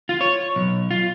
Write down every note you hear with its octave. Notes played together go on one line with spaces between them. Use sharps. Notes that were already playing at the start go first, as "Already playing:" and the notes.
F4
C#5
B1
F4